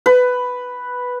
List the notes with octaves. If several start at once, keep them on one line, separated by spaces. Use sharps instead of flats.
B4